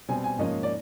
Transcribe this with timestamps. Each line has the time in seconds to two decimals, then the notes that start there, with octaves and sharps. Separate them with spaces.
0.09 B2 G3 C4 G#5
0.24 G#5
0.39 G#2 F3 A#3 C#4 D#5
0.63 D5